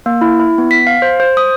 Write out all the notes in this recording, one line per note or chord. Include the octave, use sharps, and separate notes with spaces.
A#3
E4
E4
B3
B6
F5
C5
C5
D#6